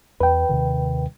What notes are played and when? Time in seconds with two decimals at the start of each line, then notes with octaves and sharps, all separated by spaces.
0.20 E2 B4 G5
0.49 D#2 C3 D#3